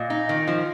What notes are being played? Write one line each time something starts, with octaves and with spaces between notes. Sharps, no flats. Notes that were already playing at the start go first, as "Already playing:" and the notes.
Already playing: A#2 D#5
D#4
D#3
F3